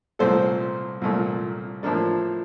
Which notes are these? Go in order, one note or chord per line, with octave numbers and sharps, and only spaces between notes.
C2 A#2 A3 A4 C5
C2 A#2 A3
A2 F3 A#3 D4